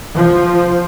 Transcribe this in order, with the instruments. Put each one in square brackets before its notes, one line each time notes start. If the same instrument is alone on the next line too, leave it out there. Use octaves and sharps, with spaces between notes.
[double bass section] F3